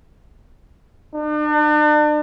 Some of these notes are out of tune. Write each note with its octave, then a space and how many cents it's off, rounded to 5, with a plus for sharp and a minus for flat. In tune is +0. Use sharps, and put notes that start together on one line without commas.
D4 +40